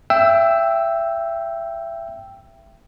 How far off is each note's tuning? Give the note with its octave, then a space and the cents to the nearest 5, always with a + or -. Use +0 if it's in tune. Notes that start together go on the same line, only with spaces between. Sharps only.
E5 +25 G5 +0 E6 +0